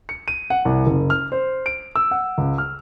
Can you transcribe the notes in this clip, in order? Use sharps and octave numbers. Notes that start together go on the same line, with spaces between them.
C#7
D#7
F#5
C2
F#1
F6
C5
D7
E6
F#5
C#2
F6